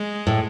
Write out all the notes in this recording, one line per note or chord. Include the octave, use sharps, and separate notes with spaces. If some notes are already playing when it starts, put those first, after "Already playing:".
Already playing: G#3
A2